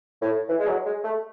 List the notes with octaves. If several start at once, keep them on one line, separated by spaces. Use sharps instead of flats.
A2
E3
G#3
F#3
G#3
A3